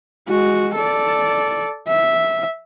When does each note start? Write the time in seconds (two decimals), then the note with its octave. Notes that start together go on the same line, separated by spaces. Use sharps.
0.29 G#3 F#4
0.75 A4 D5
1.88 E5